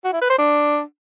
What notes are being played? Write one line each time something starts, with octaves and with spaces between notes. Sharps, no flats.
F#4
E4
B4
C5
D4